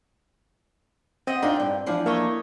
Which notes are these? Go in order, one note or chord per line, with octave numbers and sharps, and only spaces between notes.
C4 D#5 E5 F#5
D4 D#4 F4 G5
G2
E3 F3 D4
A3 A#3 C#5 D#5